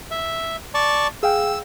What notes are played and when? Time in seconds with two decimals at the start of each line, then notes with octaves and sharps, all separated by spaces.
0.11 E5
0.74 D5 A5 C#6
1.23 G#4 F5 G5 E6